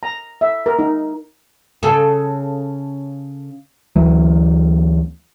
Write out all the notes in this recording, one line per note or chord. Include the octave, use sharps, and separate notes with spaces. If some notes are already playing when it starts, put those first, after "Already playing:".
A#5
E5
A#4
D#4
C#3 A4
D2 E3 F#3